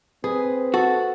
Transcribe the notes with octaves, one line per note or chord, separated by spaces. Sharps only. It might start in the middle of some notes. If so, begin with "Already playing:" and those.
C4 G#4 B4
F#4 A4